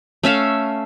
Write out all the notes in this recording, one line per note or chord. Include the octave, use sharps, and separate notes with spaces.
A3 C#4 E5 F5